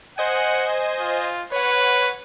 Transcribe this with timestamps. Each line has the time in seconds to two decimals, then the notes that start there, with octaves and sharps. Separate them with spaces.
0.18 C5 D#5 F#5 G#5
1.01 F4
1.52 B4 C#5 F#5